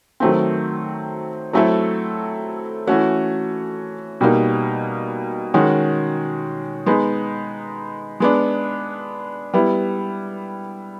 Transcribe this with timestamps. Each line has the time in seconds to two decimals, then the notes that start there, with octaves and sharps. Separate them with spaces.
0.20 D#3 F#3 A3 C4
1.53 F#3 A3 C4 E4 A4
2.87 E3 A3 C#4 F#4
4.21 B2 G3 A#3 D#4
5.54 D#3 G#3 C#4 F#4
6.86 G#3 B3 D#4
8.20 G#3 B3 D4
9.53 G3 B3 E4